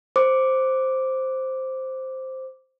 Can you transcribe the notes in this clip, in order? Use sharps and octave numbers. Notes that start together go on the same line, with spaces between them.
C5 D6